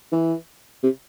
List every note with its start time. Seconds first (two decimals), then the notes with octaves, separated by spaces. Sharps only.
0.12 E3
0.83 C3